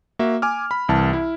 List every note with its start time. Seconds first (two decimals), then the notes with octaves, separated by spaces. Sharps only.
0.19 A#3 F#4 E5
0.42 G#5 D6 F6
0.71 B5
0.89 C2 E3 A5
1.13 E4